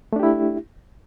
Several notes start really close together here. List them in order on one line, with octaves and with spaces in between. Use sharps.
A3 D4 G4 E4